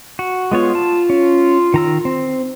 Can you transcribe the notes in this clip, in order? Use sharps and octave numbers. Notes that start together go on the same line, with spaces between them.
F#4
G#3 B3 F4 C#5
A5
C#4
D#3 A#5 E6
C4